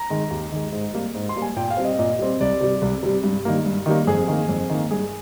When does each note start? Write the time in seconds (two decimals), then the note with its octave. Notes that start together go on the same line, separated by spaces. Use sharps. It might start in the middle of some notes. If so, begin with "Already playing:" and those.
Already playing: A#5
0.10 D#3 G#3
0.31 D#2
0.52 D#3 G#3
0.72 G#2
0.93 G3 A#3
1.14 G#2
1.29 C6
1.36 G3 A#3
1.42 G#5
1.56 A#2 G5
1.70 F5
1.77 G3 C4
1.84 D#5
1.99 A#2 D#5
2.19 G3 C4
2.40 C2 D5
2.60 C3 G3
2.82 C2
3.03 C3 G3
3.24 G2
3.45 D#3 G3 A#3
3.66 G2
3.86 D#3 G3 A#3
4.07 F2 G#4
4.28 D#3 A#3
4.49 F2
4.69 D#3 A#3
4.91 G2 G#4